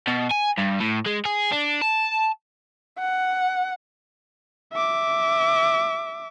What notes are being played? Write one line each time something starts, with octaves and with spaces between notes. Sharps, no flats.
B2
G#5
G2
A2
G#3
G#4
D4
A5
F#5
E5 D6